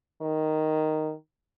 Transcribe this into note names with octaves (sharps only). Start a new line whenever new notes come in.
D#3